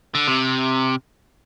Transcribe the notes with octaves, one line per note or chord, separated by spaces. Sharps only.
D3
C3